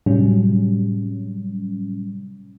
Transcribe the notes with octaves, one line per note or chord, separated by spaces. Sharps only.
A2 C3 F#3 G3 C#4